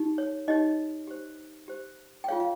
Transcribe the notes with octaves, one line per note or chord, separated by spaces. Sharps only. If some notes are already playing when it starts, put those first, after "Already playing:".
Already playing: D#4 G4
C#5
D#4 G4 C#5 D#5
G4 C5
G4 C5
G5
F4 G#4 C#5 F5
F5